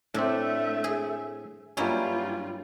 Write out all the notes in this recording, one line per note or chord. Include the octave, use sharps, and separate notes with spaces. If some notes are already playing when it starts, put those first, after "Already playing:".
A2 A3 C4 D4 E5
G#4
G2 F#3 G3 A#3 C#4 E4 F4